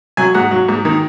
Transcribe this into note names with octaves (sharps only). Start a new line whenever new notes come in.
F#3 G#5
G#2 F#5
F#3
G#2
D#3